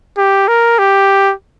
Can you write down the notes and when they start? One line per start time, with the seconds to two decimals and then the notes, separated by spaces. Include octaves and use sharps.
0.18 G4
0.48 A#4
0.79 G4